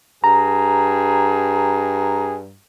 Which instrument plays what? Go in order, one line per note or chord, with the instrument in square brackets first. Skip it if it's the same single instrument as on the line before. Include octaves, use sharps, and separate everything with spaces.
[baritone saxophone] G2 [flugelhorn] G#4 [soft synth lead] A#5